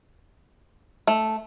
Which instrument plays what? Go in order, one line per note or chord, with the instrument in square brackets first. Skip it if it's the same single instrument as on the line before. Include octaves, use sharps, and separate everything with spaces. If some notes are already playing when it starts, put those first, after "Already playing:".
[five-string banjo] A3